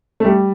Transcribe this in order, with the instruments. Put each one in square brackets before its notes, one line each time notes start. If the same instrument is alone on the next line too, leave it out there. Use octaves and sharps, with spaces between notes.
[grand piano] A3
G3